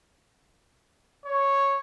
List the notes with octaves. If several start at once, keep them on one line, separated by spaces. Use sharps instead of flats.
C#5